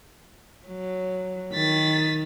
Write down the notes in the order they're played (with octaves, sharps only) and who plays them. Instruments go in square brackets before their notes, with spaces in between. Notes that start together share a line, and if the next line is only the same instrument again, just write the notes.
[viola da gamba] F#3
[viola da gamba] D#3 [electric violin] A6 B6